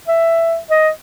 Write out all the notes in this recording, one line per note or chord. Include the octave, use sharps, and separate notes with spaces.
E5
D#5